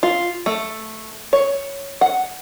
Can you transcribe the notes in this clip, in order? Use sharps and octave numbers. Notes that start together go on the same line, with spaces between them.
F4
A3
C#5
F#5